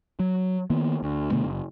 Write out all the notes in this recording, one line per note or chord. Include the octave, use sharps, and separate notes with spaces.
F#3
D#3 A#3 B3
D2
B2 D3 A3 B3
F#1